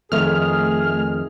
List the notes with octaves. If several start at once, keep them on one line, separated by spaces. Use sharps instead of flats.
F2 D#3 A3 G#4 F6